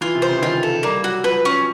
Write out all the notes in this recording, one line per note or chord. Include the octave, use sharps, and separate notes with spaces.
E3 F4
C3
C5
C#3
E3
D#3 F4
A4
G3 A#3
F#3 F#4
F3 B4
C#4